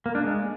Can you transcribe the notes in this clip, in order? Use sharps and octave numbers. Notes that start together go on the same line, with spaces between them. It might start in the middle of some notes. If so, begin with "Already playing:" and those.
A#3
D4
G#3